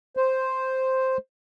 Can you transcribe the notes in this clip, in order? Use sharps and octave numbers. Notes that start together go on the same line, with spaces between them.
C5